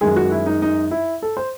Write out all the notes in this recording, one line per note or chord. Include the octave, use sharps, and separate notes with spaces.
F#2 D#3 G#3 G#4
F#4
E4
D#4
D#4
E4
A4
C5